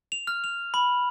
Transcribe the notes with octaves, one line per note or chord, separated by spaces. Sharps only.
F7
F6
F7
B5